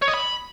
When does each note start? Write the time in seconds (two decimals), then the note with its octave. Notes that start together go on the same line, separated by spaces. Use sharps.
0.02 C#5
0.08 D#5
0.14 B5